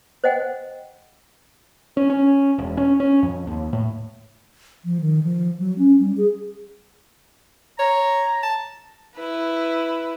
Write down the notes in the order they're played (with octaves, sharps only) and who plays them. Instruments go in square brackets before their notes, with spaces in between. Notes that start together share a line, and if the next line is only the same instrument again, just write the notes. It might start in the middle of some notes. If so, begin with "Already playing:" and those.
[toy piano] C5 D#5 F#5 G5
[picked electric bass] C#4
C#4
E1
C#4
C#4
F2
D#2
A2
[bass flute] F3
D#3
F3
F#3
C#4
G3
G#4
[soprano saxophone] C#5 [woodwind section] A#5
[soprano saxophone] A5
[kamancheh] E4 B4